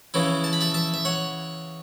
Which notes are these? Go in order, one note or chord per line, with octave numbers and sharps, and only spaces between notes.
C#3 E3 C#4 E4
A5
B5
E5 A5
E5 A5
E5
C#5 F#5